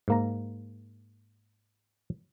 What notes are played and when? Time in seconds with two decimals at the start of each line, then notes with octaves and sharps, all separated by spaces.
0.08 G#2 A#3 A#5